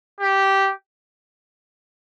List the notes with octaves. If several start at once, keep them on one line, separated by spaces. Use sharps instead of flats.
G4